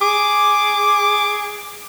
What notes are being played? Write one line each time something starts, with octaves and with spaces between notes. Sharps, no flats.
G#4 D6